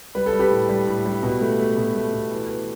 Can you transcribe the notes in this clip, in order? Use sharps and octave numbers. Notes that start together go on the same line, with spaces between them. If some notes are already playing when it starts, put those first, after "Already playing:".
G3 B4
A4
G3
G4 B4
A2
G3
A2
G3
B2
A3
A3
B2
A3
B2
E3
E3